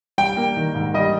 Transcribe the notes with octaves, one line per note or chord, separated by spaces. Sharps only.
G3 G5
A#3
D#3
G#2
G3 D#5